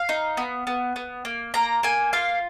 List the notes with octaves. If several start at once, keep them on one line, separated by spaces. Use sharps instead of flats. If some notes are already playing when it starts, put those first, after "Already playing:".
Already playing: F5
D#4
B3
B3
B3
A#3
A#3 A#5
A#3 G#5
F4 F5